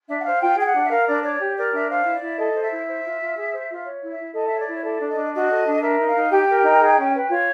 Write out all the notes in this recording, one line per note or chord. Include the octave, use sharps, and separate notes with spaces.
D4 E5
F#5
C5 F5
F4 G5
G#4 G5
F#5
D4
E5
A#4 F5
D4 D5
C#5 D5
G4
A#4 D5
D4 E5
C5 F5
E4
D5
E4
A4 D#5
C5
E5
E4
C5
F4
F4
G#4
C5
F4
C#5
E4
E5
E4
A4 D#5
C#5 E5
D5
E4 C#5
A4 D5
D4
D#5
D4
F#4 D#5
A4
D4
A#4 E5
D#4
F5
D#4
G4 G5
A#4
D#4
G#4
C#4
B4
F4 C#5